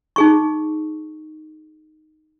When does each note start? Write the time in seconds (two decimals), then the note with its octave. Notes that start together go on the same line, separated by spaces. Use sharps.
0.16 D#4 G#4 C#6